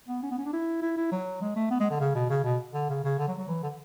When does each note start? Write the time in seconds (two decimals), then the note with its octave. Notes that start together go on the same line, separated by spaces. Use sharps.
0.08 B3
0.23 C#4
0.31 B3
0.38 C#4
0.46 D4
0.53 E4
0.82 E4
0.97 E4
1.12 F#3
1.41 G#3
1.56 A3
1.71 B3
1.80 G#3
1.91 D3
2.00 C#3
2.15 B2
2.30 C#3
2.44 B2
2.74 D3
2.89 C#3
3.04 C#3
3.18 D3
3.28 F#3
3.38 F#3
3.48 E3
3.63 D3